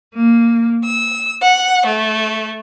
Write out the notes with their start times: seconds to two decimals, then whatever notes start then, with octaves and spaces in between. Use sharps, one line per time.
0.15 A#3
0.85 E6
1.42 F#5
1.85 A3